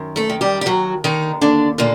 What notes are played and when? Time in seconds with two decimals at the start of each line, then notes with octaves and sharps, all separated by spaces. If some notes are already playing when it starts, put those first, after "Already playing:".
Already playing: F#2 D#3
0.16 A3 A4
0.30 D#3
0.41 G3 G4
0.61 G4
0.66 D#2 F#3 F#4
1.04 D3 D#3 D#4
1.41 D#2 D3 D4
1.78 A#2 D3 A#3